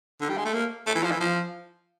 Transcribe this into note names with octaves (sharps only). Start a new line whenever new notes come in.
D3
G3
G#3
A3
A#3
A3
E3
F3
E3
F3